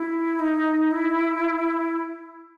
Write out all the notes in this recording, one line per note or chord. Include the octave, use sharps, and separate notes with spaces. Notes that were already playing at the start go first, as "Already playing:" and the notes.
Already playing: E4
D#4
E4